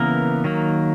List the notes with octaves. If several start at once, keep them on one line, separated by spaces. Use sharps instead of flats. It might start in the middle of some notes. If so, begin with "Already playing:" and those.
Already playing: C#3 E3 A#3 B3 A#4
D#3 F#3 A#3